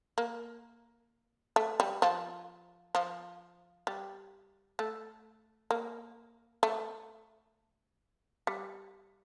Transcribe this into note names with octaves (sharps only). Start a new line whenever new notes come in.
A#3
A3
G3
F3
F3
G3
A3
A#3
A3
G3